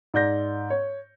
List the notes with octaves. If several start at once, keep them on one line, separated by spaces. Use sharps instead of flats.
G#2 D5 G6 A#6
C#5